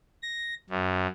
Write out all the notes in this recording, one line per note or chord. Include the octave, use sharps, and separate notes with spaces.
A#6
F#2